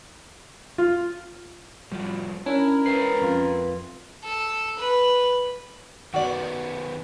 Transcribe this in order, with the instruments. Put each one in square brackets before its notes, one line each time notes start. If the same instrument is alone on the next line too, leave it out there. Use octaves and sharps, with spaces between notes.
[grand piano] F4
[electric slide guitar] A2 F3 G3
[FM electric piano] C#4 [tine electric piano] D4 [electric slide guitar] E4 [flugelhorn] A#4
[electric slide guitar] B4 E5 G5 [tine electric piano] C7
[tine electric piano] F2 F4
[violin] A4
B4
[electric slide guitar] D#3 B3 [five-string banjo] F#4 D5